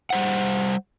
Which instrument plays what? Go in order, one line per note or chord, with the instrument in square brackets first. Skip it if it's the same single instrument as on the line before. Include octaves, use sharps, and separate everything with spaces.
[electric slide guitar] G3 C5 F#5